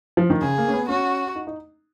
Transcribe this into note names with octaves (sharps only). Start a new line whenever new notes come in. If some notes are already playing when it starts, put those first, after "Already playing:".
F3
D#3
C#3 G#4
A#3
C#4
B3
C#4 F#4
D#4
D#4